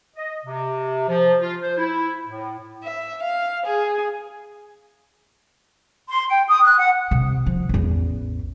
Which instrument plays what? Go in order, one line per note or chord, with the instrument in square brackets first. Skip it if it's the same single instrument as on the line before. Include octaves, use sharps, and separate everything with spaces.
[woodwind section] D#5
C3
F3
F4
C5
E4
A2
[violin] E5
F5
G#4
[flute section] C6
G5
D#6
F#6
F#5
[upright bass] C3
F3
A1 E2